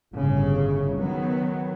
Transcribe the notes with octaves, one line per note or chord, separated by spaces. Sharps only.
G1 A2 C#3
D#3 F#3 B3